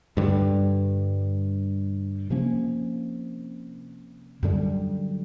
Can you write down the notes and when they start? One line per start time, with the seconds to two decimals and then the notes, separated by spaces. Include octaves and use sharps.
0.17 G2 D3 G3
2.30 C3 F3 A#3 C#4
4.43 F#2 D3 G3